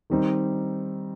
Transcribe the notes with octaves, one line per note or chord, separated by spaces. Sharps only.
D#3 G3 C4 D#4